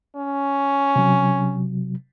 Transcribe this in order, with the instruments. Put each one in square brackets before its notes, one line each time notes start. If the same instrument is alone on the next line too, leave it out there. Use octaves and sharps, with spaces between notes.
[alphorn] C#4
[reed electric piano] C3 F#3